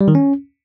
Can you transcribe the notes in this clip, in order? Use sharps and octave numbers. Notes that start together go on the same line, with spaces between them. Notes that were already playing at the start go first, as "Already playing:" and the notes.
G3
D#3
C#4